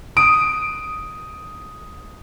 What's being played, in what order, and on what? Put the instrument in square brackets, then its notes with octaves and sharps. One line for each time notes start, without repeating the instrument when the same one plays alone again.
[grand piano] D#6 D7